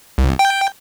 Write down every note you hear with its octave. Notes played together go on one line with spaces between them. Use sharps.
C2
G5